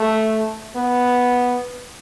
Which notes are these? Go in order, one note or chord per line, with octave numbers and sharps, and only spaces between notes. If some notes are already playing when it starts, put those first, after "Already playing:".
Already playing: A3
B3